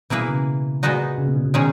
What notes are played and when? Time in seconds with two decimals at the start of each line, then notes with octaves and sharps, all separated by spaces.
0.10 B2 E3 A#3 E4 G#4 B4
0.29 C#3
0.83 A#2 G#3 B3 D#4 F#4
1.18 C#3
1.28 B2
1.36 C#3
1.45 B2
1.54 D#3 G#3 C#4 G#4